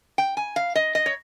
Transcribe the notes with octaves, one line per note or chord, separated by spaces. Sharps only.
G5
G#5
F5
D#5
D#5
C#5